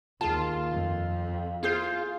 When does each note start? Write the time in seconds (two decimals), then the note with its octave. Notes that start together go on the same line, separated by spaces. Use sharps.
0.21 D#2 F4 G#4 A5
0.72 F2
1.63 E4 F4 G#4 C5